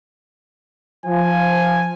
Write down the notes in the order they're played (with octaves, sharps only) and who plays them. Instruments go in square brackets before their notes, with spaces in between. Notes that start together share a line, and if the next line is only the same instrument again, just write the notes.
[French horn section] F3 [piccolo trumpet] G#5